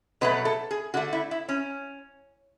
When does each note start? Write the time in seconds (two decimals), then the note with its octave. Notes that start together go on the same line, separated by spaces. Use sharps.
0.21 B2 F#3 A3 B4
0.45 A4
0.71 G#4
0.94 D3 A3 F#4
1.13 E4
1.31 E4
1.49 C#4